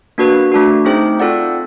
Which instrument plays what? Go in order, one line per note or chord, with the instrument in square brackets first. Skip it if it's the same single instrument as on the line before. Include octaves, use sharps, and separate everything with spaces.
[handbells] A#3 D4 F#4 B4
A3 D4 F#4
A3 C4 D#4 G#4 C5
C4 F4 A4 D5 F#5